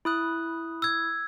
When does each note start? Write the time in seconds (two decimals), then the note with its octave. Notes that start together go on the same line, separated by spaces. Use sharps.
0.05 E4 D#6 F#6
0.82 E6 G#6